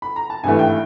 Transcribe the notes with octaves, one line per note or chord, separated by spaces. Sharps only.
B5
A#5
A5
G#1 G2 E3 A3 G#5
G5